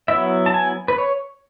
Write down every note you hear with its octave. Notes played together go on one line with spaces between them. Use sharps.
F#3 B3 E4 E5
A5
G#5
B4
C#5